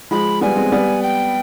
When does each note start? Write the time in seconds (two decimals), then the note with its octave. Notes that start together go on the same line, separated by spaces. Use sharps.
0.11 F3 G#3 B5
0.41 G3 B3 G#5
0.56 G#3 C4
0.72 G3 B3
1.03 G5